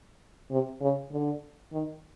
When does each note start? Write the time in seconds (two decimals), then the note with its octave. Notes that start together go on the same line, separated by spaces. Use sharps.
0.51 C3
0.81 C#3
1.12 D3
1.73 D#3